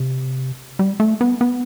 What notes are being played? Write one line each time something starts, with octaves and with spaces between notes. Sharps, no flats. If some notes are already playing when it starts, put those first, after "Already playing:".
Already playing: C3
G3
A3
B3
B3